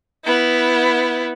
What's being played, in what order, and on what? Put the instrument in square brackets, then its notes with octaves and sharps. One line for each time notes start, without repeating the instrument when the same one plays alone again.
[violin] B3 E4